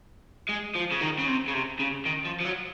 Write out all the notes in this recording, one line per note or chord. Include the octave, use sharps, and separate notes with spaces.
G#3
F3
C#3
D#3
C#3
C3
C#3
C3
C#3
D#3
F3
F3
F#3